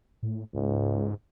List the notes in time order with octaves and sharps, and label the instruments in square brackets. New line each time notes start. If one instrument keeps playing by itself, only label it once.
[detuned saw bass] A2
[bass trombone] C#2 [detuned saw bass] G#2